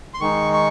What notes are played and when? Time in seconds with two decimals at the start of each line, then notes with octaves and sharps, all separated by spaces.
0.14 C6
0.21 D#3 G#3 D#4 C#6
0.53 C#6